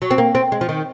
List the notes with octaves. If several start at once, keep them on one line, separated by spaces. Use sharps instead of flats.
F#3
C4
A#3
C4
G#3
F3
D#3